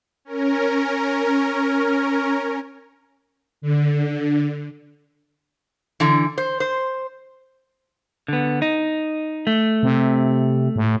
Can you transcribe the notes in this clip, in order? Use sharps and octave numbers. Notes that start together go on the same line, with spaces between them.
C#4 A#4
D3
D3 E3
C5
C5
D3 B3
D#4
A3
C3
A2